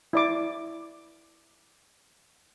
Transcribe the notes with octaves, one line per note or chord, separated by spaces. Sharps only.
E4 D5 D6